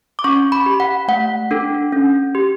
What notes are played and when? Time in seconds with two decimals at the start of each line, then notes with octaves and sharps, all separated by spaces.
0.19 D6
0.24 C#4 C#6
0.52 B5
0.66 G4
0.80 F#5
1.08 A3 F#5
1.51 D4 A4
1.92 C#4
2.35 G4